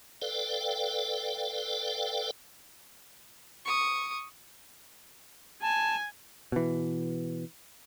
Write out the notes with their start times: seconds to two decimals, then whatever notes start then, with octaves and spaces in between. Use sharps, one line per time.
0.22 A4 B4 D5 F5 G5
3.65 C#6 D#6
5.62 G#5 A5
6.52 B2 E3